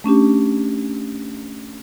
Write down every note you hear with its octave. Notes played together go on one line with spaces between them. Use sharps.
A3 C#4 D4 G4